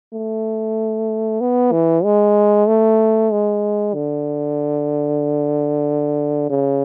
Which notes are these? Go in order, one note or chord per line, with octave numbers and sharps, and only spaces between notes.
A3
B3
E3
G#3
A3
G#3
D3
C#3